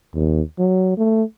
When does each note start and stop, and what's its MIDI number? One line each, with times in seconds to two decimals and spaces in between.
0.15 0.41 39
0.59 0.93 54
0.98 1.23 57